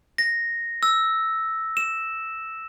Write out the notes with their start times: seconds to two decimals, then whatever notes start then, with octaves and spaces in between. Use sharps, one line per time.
0.18 A#6
0.83 E6
1.77 E7